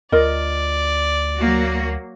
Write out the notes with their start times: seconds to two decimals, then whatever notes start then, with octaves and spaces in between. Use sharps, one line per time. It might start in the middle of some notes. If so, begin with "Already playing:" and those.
0.12 D2 F4 A#4 D5 D#5
1.37 F#3 A#3 F#4